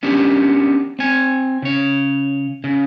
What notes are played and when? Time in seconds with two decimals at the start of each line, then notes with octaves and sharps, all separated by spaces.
0.03 B3 C#4 D4 G4 A#4
0.99 C4 G#5
1.62 C#3 C#5
2.64 C#3